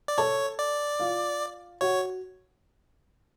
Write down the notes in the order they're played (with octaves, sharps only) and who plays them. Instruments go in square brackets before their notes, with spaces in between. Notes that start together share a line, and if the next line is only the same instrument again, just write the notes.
[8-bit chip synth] D5
[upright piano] A4 A5 [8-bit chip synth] C#5
[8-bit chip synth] D5
[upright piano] F4 F5
[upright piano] F#4 F#5 [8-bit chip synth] C#5